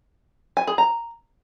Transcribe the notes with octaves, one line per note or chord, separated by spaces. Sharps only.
G#5
G#4
A#5